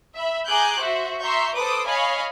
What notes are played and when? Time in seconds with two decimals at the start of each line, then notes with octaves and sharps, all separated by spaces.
0.15 E5 B5
0.47 G#4 G#5 A#5 D6 F#6 G6
0.80 F#4 C5 E5
1.22 E5 A#5 C6 C#6 G6
1.54 A4 B4 C5 D6 D#6
1.86 C#5 D#5 F5 G#5 B5